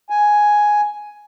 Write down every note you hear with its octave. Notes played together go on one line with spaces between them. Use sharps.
G#5